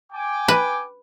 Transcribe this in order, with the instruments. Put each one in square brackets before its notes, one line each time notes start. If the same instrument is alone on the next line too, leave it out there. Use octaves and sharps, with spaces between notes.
[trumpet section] G5 G#5 D6
[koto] B4